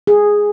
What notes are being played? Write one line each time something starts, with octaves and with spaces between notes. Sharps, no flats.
G#4